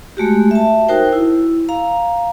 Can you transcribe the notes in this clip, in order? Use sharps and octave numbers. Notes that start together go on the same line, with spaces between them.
G#3 A3 F#4 G4
E5 A5
D#4 F#4 A#4 C5 G5
E4
F5 A#5